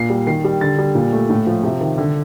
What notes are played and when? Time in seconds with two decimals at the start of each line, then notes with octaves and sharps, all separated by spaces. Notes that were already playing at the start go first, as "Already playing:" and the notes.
Already playing: A#2 C7
0.10 G3
0.27 D#3 C7
0.44 G3
0.61 D3 A6
0.79 G3
0.95 A#2
1.13 A3
1.30 A2
1.47 F3
1.63 C3
1.81 D#3
1.98 D3